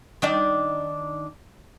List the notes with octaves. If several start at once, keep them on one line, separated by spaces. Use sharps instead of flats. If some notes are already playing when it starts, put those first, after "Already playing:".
D#3 D4 D5